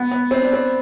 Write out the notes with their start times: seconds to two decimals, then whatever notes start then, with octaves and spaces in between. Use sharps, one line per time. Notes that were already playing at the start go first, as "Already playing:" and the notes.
Already playing: B3
0.12 B3
0.31 C4
0.42 D4
0.53 C4